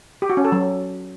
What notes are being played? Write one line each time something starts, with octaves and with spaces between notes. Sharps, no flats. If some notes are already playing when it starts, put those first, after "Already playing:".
G4
F#4
C#4
A4
F#3